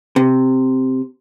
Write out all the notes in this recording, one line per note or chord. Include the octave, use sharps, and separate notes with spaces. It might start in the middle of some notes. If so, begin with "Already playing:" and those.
C3